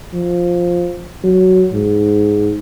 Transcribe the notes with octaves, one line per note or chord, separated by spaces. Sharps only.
F3
F#3
G#2